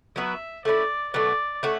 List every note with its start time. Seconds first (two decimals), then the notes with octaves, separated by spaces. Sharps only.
0.16 F#3 B3 E4 B4 E5
0.65 A3 C#4 E4 D5
1.13 B2 F#3 A3 D5
1.63 A3 C#4 F#4